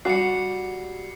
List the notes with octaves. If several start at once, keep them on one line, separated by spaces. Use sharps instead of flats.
G3 F#4 C7 C#7